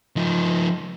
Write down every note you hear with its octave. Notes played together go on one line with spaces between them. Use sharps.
F3 D#4